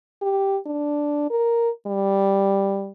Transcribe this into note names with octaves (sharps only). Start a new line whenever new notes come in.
G4
D4
A#4
G3